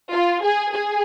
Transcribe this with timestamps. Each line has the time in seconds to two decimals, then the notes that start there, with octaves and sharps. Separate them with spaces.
0.12 F4
0.42 G#4
0.72 G#4